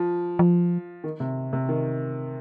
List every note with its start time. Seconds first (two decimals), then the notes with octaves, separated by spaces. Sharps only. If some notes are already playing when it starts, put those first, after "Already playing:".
Already playing: F3
0.39 F3
1.04 D#3
1.20 C3
1.53 C3
1.69 D#3